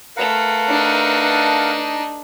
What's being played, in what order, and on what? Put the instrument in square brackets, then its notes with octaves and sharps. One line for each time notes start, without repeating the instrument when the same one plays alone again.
[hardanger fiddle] A3 B4 [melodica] A#4 F5 F#5
[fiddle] D4 D#4